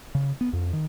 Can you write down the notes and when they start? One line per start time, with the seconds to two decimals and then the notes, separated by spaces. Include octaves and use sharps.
0.15 C#3
0.41 B3
0.53 F2
0.73 D#3